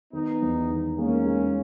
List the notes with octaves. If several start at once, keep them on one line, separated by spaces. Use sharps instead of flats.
D#3 B3 D#4
E2
D#3
G#3 A#3 C#4
G#3